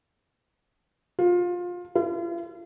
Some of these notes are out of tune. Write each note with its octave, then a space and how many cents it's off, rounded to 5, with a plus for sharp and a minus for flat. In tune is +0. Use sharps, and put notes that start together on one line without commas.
F4 +20
F4 -45